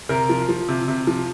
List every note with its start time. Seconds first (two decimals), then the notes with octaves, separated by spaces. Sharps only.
0.09 C3 A#4
0.29 F3
0.49 F3
0.68 C3
0.88 C3
1.07 F3